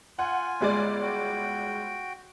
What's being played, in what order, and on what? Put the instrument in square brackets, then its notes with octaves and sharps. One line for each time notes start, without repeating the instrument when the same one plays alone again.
[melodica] F4 G#5 [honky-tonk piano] F#5
[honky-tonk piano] G1 G#3 D5
[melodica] F#4 G5